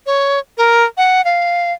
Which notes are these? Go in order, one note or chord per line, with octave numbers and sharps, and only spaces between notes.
C#5
A#4
F#5
F5